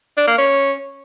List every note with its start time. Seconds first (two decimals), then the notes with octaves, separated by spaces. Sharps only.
0.17 D4
0.28 A#3
0.38 C#4